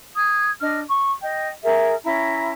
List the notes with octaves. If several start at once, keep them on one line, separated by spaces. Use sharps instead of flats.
D#6 G#6
D4 D#5 F6
C#6
D#5 G5
G#4 A#4 E5
C#4 E4 A#5